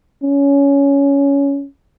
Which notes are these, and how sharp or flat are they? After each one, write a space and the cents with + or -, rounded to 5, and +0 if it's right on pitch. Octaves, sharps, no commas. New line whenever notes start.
C#4 +15